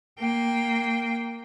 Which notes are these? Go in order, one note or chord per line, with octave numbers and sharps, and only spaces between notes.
A#3 G5